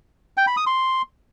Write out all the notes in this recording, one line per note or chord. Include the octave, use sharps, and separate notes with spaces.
G5
B5
D#6
C6